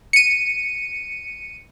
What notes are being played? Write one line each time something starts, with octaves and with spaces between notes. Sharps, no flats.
C#7 D#7